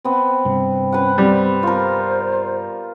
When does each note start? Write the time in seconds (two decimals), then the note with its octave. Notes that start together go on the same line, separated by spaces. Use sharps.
0.04 B3 C4
0.45 G2 C3
0.92 C#4 B4 F#5
1.18 G3 C4
1.63 F4 A#4 C5